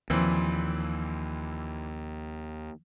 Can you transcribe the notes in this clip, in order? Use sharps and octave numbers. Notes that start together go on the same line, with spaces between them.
D#2 A#2 E3 F3 C4